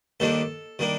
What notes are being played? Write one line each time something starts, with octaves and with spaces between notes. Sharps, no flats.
D#2 D#3 G3 A#3 D4 A4
D#3 G3 A#3 D4